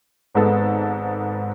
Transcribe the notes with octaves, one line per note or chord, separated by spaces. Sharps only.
G#1 G#2 G#3 B3 A4